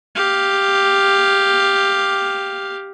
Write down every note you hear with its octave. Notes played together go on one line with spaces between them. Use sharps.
G4 F5